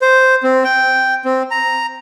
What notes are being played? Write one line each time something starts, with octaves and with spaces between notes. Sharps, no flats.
C5
C4
G5
C4
A#5